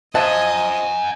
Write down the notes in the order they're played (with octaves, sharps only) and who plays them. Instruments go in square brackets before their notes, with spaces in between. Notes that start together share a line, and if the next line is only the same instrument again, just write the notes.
[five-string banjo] F3 E5 A5 [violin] D#5 [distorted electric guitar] F#5 G#5